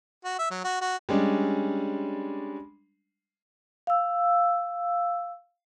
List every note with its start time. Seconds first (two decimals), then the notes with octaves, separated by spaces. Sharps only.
0.25 F#4
0.39 E5
0.51 F#3
0.64 F#4
0.81 F#4
1.09 G3 G#3 C#4 D4
3.87 F5 E6